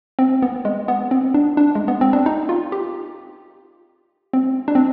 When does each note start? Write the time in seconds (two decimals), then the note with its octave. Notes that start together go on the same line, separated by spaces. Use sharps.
0.19 C4
0.42 B3
0.65 G#3
0.88 B3
1.11 C4
1.34 D4
1.57 D4
1.75 G#3
1.88 B3
2.01 C4
2.13 D4
2.26 D#4
2.49 F4
2.72 G4
4.33 C4
4.68 D4
4.75 C4